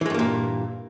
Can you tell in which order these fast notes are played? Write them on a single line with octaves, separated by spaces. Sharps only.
E3 G#3 G2 A#3 A#2